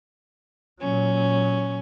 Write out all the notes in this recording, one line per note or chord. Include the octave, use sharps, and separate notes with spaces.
A#2 F#3 C#4